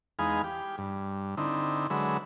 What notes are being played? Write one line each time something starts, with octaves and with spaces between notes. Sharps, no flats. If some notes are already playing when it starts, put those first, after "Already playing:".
E2 G#3 D#4 B4 F5 G#5
G4
G2
D3 C4 D#4 E4
D3 F#3 G#3 B4 E5